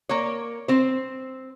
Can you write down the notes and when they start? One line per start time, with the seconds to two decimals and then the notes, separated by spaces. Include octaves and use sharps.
0.09 A#3 C#5
0.68 C4 C5